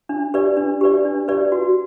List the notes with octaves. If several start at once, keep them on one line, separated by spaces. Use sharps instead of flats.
D4
G4 B4 D5
D4
G4 B4 D5
D4
G4 B4 D5
F#4